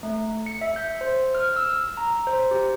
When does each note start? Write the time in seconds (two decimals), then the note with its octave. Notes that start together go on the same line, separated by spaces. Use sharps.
0.03 A3
0.46 C#7
0.61 E5
0.76 G6
1.01 C5
1.35 F6
1.56 E6
1.97 A#5
2.27 C5
2.51 G4